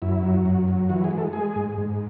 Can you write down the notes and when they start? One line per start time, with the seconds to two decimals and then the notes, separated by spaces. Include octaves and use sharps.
0.02 F#2 E4
0.23 F#3
0.45 F#2
0.68 F#3
0.89 E3 F#4
1.04 G#4
1.11 G#3
1.18 A4
1.33 G#3 G#4
1.56 G#2
1.78 G#2